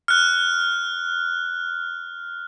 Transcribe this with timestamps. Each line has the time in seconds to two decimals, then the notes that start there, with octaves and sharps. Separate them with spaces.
0.08 F6 F#6